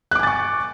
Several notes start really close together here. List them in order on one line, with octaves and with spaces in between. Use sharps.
F#6 D6 G#5 A6 C#6